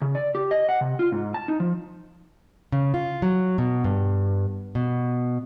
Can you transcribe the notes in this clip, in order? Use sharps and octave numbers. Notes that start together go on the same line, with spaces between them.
C#3
D5
G4
D#5
F#5
C3
F4
G#2
A5
D#4
F3
C#3
F4
F#3
B2
G2
B2